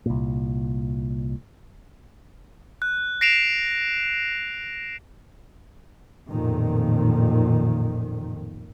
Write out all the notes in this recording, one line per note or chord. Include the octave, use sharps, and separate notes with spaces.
C2 A#2
F#6
A#6 C7 D7 E7 F7
A1 F2 A#2 D#3